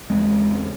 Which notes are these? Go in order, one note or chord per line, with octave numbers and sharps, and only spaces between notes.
E2 C#3 G#3 C4